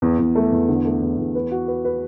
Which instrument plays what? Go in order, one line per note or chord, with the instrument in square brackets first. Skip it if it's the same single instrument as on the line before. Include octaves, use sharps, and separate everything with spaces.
[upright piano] E2
E2
A3
E2
D3
A3
E2
E2
B4
F#4
B4
B4